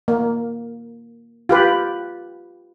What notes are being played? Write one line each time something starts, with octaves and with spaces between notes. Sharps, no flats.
A#3
F4 G4 B4